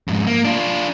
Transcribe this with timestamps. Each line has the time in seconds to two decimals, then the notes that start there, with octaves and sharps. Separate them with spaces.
0.08 F2 G#2
0.27 A#3
0.45 D4 F4